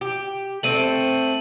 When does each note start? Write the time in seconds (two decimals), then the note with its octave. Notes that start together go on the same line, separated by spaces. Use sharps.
0.01 G4
0.63 A3 C4 D#7 F#7